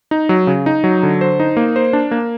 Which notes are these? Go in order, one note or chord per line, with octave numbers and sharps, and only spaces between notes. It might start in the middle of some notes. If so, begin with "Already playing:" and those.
D#4
F#3
C#3
D#4
F#3
D3
C5
D#4
A#3
C5
D4
A#3